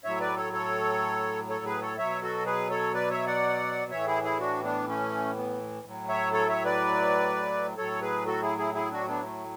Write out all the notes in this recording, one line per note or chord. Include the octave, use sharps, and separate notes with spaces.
A2 F#3 C#5 E5
B4 D5
A4 C#5
A4 C#5
A4 C#5
G#4 B4
A4 C#5
B2 F#3 C#5 E5
F#4 A4
G#4 B4
A4 C#5
B4 D5
C#5 E5
D5 F#5
A2 E3 C#5 E5
E4 G#4
E4 G#4
D4 F#4
B3 D4
A3 C#4
B3
A2 F#3
C#5 E5
A4 C#5
C#5 E5
B4 D5
A2 F#3 A4 C#5
G#4 B4
F#4 A4
E4 G#4
E4 G#4
E4 G#4
D4 F#4
B3 D4
A3